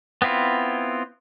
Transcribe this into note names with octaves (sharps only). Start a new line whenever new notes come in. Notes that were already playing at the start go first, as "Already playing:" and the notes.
B3 C4 E4 F4